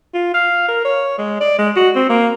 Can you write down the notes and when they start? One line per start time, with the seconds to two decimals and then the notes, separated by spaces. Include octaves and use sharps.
0.14 F4
0.34 F5
0.68 A#4
0.85 C#5
1.18 G#3
1.41 D5
1.59 G#3
1.76 F#4
1.95 C4
2.10 A#3